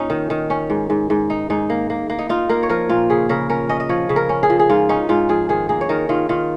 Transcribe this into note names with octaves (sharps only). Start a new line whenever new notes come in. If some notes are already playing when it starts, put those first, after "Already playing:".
Already playing: A#2 C#4 D#4
D#3
D#3
C#4
G#2
G#2
G#2
D#4
G#2 D#4
A#3
A#3
A#3
D#4
D#4 F4
A#3 A#4
C#5
F3 A#4
A#2 F4
C#3 G#4
C#3 A#4
C#4 A#4
C#4 D#5
D#5
F3 C#5
C#3
A#4
C#4
G#4
F3
G#4
G#2 F4
C#4 D#4
G#2 F4
F3 G#4
D#3 G#4
A#3 G#4
C#5
D#3 A#4
D#3 F4
D#3 F4